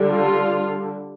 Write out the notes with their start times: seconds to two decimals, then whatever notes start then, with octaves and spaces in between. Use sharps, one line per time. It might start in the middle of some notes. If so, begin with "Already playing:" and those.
Already playing: D3 G3 D4
0.08 F4